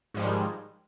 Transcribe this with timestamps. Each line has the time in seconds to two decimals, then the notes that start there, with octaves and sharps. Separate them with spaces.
0.14 G#2
0.17 F3
0.19 G3
0.22 D#3
0.25 G#3